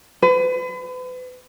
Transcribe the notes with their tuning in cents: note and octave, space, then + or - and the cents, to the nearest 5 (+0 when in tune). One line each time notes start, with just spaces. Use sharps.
B4 +40